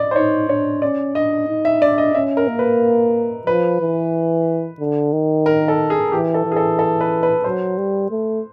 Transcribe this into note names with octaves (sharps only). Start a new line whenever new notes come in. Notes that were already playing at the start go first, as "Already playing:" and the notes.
Already playing: D5 D#5
C5
D#4 C#5
D4 C#5
C#4 D5
D4 D#5
D#4
E5
D4 D5
D#5
C#4 E5
A#4
A#3
B4
F3 B4
E3
D3
D#3
A#4
A4
G#4
E3 G4
A4
E3
G#4
A4
A4
B4
B4
F#3 C5
G3
A3